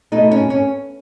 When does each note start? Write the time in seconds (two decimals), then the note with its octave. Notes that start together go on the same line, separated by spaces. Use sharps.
0.12 B2 A3 D#4
0.31 C#4
0.50 C#4